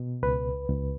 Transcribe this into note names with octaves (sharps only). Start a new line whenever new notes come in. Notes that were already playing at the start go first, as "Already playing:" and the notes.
Already playing: B2
C#2 B4
C#2